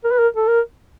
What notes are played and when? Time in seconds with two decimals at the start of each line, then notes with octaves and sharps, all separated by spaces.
0.04 A#4
0.12 B4
0.19 A#4
0.36 A4
0.47 A#4